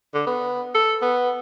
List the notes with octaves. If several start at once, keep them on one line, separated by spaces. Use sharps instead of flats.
D3
B3
A4
B3